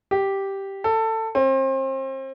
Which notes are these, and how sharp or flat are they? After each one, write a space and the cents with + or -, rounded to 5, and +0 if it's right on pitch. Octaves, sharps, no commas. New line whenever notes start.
G4 -5
A4 +20
C4 +35